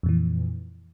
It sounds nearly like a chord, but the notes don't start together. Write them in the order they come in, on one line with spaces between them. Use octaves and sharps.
F2 A#2 E3